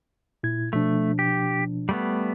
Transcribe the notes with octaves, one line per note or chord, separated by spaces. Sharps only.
A#2 E4 G#6
B2 F3 A3 D4
G4
G3 A3 B3